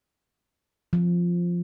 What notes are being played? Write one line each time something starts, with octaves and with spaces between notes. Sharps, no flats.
F3